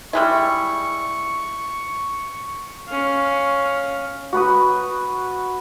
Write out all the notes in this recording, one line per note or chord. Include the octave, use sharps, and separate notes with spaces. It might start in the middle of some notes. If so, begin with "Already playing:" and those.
G3 G#3 E4 C#6
C#4 F5
F#4 B4 B5 D#6